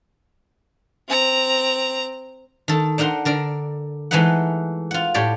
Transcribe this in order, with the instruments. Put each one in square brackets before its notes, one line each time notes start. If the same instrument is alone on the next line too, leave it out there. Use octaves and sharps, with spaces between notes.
[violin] C4 A#5
[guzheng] D#3 A4
D4 D#4 A#4 F#5 C6
D3 A#4 D5
E3 G#3 A3 D#4 B4 F#5
F4 F#5
A2 G4 C#5 D5